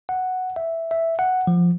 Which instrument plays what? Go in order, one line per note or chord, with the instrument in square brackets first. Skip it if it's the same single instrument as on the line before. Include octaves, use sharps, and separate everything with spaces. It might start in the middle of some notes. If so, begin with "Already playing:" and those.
[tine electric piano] F#5
E5
E5
F#5
F3